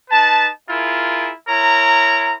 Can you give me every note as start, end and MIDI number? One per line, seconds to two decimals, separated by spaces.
0.10 0.48 63
0.10 0.48 71
0.10 0.48 81
0.68 1.31 64
0.68 1.31 65
0.68 1.31 68
0.68 1.31 70
1.48 2.33 64
1.48 2.33 70
1.48 2.33 73
1.48 2.33 82